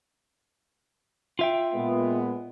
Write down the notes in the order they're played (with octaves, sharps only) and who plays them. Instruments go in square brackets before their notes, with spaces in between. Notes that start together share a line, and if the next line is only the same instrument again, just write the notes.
[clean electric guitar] F4 E5 G5
[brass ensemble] A#2 G#3 B3